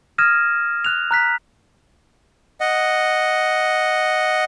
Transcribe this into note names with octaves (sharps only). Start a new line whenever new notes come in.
D#6 F6 G#6 A#6 D#7 E7
F#6 F7
A#5 F#6 B6
D#5 F#5